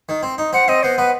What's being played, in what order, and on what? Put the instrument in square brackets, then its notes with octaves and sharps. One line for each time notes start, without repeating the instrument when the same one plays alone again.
[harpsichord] D#3
C4
D#4
[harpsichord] C4 [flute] F#5
[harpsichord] C4 [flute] D#5
[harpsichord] B3 [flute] C5
[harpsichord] B3 [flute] B4